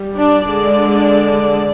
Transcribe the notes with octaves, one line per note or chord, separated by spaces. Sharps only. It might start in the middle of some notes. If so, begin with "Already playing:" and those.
Already playing: G3
D4 D5
D3 G#3 D4